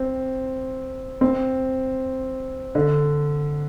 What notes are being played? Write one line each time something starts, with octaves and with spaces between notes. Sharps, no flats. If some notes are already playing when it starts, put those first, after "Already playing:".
Already playing: C4
C4
D3